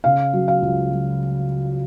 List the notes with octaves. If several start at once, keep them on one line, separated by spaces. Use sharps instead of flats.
C#3 F5
F#3
F5
C#2
F#3